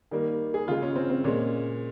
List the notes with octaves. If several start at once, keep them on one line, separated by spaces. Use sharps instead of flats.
D#3 G3 A#3
G#4
C#3 G#3 F4
C#4
C4
C4
A#2 G#3 C#4